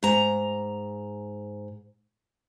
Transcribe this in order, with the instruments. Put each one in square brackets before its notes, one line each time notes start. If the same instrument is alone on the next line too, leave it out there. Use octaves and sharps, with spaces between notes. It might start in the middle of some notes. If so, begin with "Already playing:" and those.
[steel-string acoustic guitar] G#2 A#5